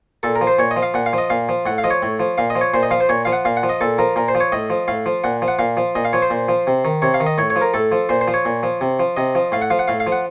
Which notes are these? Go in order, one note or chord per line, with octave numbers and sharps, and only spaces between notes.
A#2 A4
A#4
F3
C5
A#2 C#5
D#5
F3
F5
A#2 F#5
F5
F3 D#5
A#2 F5
F3
A2 F#5
F5
F3 D#5
C#5
A2
F3
A#2 F5
D#5
F3
C#5
A#2 C5
D#5
F3 F5
C5
A#2 C#5
F3 F5
F#5
A#2 F5
F#5
F3
D#5
A#2 A4
F3 A#4
A#2 A#4
C5
F3
C#5
A2 D#5
F3
A2 F5
F3
A#2 F#5
F3
F#5
A#2 F5
F3
A#2 D#5
F5
F3 C#5
C5
A#2
F3
C3
D#3
C3 C#5
F5
D#3
D#5
A2 C#5
C#5
F3
A#4
A2 A4
F3
A#2 C5
C5
F3
C#5
A#2
F3
C3
F3
C3 D#5
F3
A2 F5
F#5
F3 F5
F#5
A2 F5
F5
F3
F#5